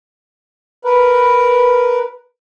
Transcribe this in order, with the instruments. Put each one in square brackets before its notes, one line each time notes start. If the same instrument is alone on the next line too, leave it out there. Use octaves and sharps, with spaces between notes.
[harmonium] A#4 B4